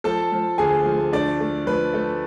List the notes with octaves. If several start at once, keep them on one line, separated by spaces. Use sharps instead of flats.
F3 A4 A5
F3
D2 G#4 G#5
F3
A3 D4 D5
A3
F3 B4
A3